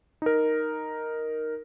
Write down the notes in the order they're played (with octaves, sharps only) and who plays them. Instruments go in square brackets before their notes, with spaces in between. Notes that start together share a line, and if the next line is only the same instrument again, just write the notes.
[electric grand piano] D#4 A#4